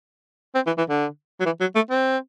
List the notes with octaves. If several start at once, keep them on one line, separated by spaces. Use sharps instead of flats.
C4
E3
E3
D3
F#3
E3
F#3
A3
C4